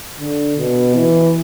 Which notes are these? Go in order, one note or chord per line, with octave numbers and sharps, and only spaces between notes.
D3
B2
E3